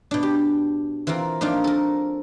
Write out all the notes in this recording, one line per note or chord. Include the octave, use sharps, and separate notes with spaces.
B2 D4
G4
E3 C4 F4 A#4
F3 A#3 D4 D#4 F4
A4 A#4